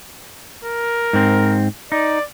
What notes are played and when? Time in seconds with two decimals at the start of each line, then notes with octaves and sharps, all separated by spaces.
0.65 A#4
1.13 G#2 C4
1.92 D#4 D5